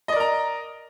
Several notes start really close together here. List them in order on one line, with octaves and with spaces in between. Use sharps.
D#5 D5 A#4 A#5